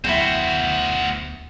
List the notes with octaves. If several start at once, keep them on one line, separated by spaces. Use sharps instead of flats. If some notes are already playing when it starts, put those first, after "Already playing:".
D2 F#3 B3 E4 F#4 C5 G5